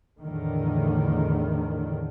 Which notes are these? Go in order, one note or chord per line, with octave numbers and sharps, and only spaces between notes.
E2 A2 D3 D#3